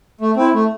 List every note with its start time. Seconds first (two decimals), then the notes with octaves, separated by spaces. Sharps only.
0.21 A3
0.36 C4 E4
0.54 A3